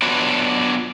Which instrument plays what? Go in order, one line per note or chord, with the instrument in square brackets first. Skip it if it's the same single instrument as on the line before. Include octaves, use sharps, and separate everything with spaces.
[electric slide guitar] F#3 B3 D4 F4 B4 F#5